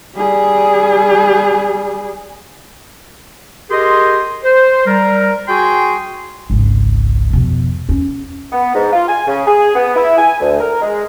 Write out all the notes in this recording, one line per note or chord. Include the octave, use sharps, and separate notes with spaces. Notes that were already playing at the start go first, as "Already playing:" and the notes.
G3 G#4
G4 G#4 A#4 D#5 G5 C6
C5
G3 A#4
F#4 G#4 G5 G#5 C6
G#1 C#2
F2 B2
E2 C#4
B3
G#2
F4
G#5
C#3
G#4
B3
E4
G#5
D2
A#4
G#3